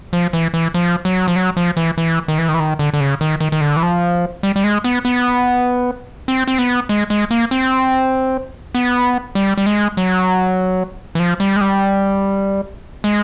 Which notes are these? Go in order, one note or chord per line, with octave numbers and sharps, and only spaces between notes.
F3
E3
E3
F3
F#3
F3
F#3
F3
E3
E3
D#3
E3
D#3
E3
D#3
D3
D3
C#3
D#3
D#3
D#3
D3
E3
F3
G3
G3
G#3
B3
B3
C4
C4
B3
G#3
G#3
A#3
C4
B3
G3
G3
G#3
F#3
E3
F3
G3
G#3
G3
G#3